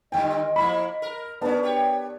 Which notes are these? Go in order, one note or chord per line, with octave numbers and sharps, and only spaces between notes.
A#2 D3 G3 D#5 G5 G#5
F3 A#3 E4 B5
A#4
B3 C#4 D4 D5 A5
G4 C#5